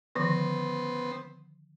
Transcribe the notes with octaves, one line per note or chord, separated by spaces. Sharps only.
D3 D#3 F3 B3 C5